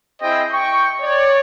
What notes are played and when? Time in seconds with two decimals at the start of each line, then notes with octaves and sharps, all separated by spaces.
0.22 C4 E4 G#4 C5 D#5 G5
0.53 G5 C#6
1.02 C#5 D5